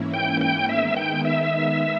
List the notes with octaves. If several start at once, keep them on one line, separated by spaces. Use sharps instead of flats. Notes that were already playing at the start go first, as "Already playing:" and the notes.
Already playing: G#2 E3 A#3 C#4 E4
G5
G5
D#3 G#3 B3 D#4 E5
G5
E5